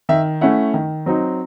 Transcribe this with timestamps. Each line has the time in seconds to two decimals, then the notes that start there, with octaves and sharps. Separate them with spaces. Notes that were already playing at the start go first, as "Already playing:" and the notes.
0.09 D#3 E5
0.41 A3 C#4 E4 F#5
0.74 D#3
1.06 F#3 C4 D#4